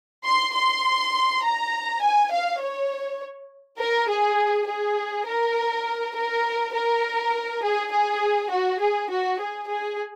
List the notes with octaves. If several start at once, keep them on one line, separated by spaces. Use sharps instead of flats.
C6
C6
A#5
G#5
F5
C#5
A#4
G#4
G#4
A#4
A#4
A#4
G#4
G#4
F#4
G#4
F#4
G#4
G#4